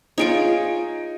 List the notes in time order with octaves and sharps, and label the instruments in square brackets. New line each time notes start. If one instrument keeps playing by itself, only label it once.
[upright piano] D#4 D7 [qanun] F4 G#4 C#5